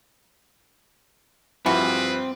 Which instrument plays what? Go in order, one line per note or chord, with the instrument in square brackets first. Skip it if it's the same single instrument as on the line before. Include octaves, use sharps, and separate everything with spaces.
[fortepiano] G2 F3 [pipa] E3 F#4 G#4 [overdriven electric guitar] C4 [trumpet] B4